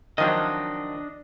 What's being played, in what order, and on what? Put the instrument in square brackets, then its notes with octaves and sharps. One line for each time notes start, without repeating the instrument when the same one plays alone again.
[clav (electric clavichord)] D#3 F3 F#3 [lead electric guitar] D4 D#5